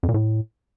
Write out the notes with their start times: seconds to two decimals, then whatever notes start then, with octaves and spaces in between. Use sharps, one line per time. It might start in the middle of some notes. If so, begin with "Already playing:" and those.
0.03 F2
0.09 A#2
0.14 A2